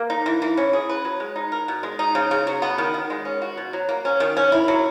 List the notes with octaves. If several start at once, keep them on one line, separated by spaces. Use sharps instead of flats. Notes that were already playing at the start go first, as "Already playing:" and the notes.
Already playing: A#3
D#4
E3
E3
C#4
G#4
B4
F#3
G#3
D#4
A#4
B2
G#3
D#4
C#3
C#3
F#3
B3
D#3
D#3
G#3
C#4
F#4
B2
F#3
A#3
C#4
D#3
C#4
E4
F#3